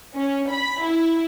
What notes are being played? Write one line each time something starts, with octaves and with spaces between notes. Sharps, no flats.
C#4
B5
E4